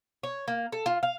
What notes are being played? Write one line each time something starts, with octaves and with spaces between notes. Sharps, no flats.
C#5
A#3
A4
F4
F5